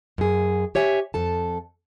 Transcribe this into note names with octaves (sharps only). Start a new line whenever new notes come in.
F#2 G#4
G4 C#5 E5 G#5
F2 A4 A5